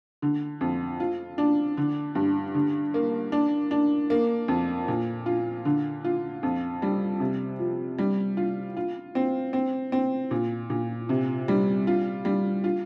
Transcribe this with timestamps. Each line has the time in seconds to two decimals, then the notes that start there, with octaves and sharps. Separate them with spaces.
0.22 D3
0.61 F2
1.00 F4
1.38 D4
1.77 D3
2.15 G2
2.55 D3
2.94 A#3
3.32 D4
3.71 D4
4.10 A#3
4.48 F2
4.88 A#2
5.26 F4
5.65 D3
6.04 F4
6.43 F2
6.82 G3
7.20 C3
7.59 F3
7.98 G3
8.37 F4
8.77 F4
9.15 C4
9.53 C4
9.92 C4
10.31 A#2
10.70 A#2
11.09 C3
11.48 G3
11.87 F4
12.25 G3
12.64 F4